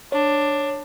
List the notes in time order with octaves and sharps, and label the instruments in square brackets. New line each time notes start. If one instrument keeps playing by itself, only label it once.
[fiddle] D4 [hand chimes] C#5